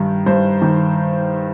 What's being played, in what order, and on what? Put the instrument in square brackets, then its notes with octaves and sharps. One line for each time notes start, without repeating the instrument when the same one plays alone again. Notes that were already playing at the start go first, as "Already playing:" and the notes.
Already playing: [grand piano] G2 D#3
G2 C5
D#3